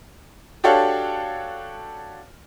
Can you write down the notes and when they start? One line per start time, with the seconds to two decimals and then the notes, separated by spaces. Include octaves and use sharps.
0.64 D4 F#4 G4 A4 C#5 F5